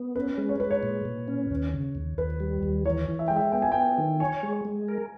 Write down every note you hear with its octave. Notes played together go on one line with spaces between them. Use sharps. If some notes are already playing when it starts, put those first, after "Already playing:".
Already playing: B3
C#4 B4
G#3
C#5
G#3 B4
C#5
A#2
A#2
C#4
D#2
C#3
D#2
D#2 B4
G3
D#2
E3 C#5
E3
E5
G#3 G5
E5
B3 G5
G#5
B3 G5
D#3
C#5 G#5
G#3
G#3
A#4